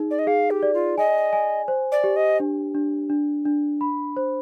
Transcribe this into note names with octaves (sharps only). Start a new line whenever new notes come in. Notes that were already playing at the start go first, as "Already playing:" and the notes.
Already playing: D#4 G#4
D5
D#5
G#4 F5
G4
D5
F4
D#5 G#5
G#5
C5
D5
G4
D#5
D4
D4
D4
D4
B5
C5